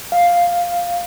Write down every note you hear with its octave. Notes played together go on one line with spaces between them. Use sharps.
F5